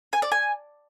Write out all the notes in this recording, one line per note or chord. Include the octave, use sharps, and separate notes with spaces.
G#5
D5
G#5